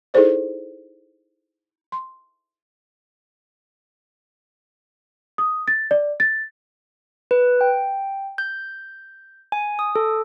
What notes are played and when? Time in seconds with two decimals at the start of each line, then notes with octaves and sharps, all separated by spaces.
0.14 D#4 E4 G#4 A4 C5 D5
1.92 C6
5.38 D#6
5.68 A6
5.91 D5
6.20 A6
7.31 B4
7.61 G5
8.38 G6
9.52 G#5
9.79 D#6
9.96 A4